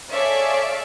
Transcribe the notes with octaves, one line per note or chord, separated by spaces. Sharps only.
G#4 A4 C#5 D5 E5 F5